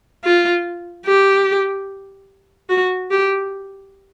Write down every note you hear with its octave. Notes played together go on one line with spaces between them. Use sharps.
F4
G4
F#4
G4